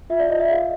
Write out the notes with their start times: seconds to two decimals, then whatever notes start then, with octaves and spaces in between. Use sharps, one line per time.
0.10 F4 E5
0.19 D5
0.29 F4 D#5
0.40 E5
0.50 G#4 F5